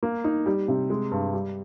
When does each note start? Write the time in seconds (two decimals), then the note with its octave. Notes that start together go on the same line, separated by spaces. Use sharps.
0.03 A#3
0.24 D#4
0.46 G3
0.68 C3
0.90 G#3
1.11 G2
1.34 G3